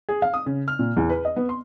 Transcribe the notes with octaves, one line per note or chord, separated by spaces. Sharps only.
G#4
F5
D#6
C#3
F6
A#2
E2
B4
D#5
B3
C6